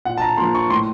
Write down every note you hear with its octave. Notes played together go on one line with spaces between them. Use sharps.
A#2 F#5
A5
A#5
F3 A#3 C6
C#6
A2 C6